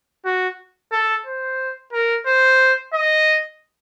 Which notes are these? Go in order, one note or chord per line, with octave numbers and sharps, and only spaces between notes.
F#4
A4
C5
A#4
C5
D#5